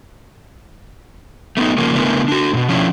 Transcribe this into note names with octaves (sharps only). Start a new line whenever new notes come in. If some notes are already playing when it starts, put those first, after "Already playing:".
A3 B3 C#4 D#4
C#3 F3 A#3
C#3 A3 B3 D4 E4 A#4
D4 F#4
G#2 B2
F3 C#4 D4 E4